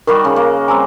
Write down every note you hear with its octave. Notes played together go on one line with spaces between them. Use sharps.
D#3 G3 F#4 A#4
C#3
A#3
G3 C4 G#5 A#5 E6